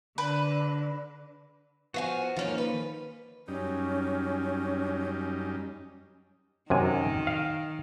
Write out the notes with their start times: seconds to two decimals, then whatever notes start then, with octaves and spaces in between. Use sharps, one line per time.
0.18 D3 B4
1.94 F3 B3 F#4 F5 G#5
2.36 G#2 D#3 F3 A#3 C#4 F4
2.58 B4
3.48 F#2 G3 C#4 D#4
6.70 F#2 C3 D#3 G#5
7.27 F5